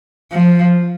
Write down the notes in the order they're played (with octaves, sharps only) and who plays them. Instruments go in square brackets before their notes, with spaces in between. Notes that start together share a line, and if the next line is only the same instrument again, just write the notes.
[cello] F3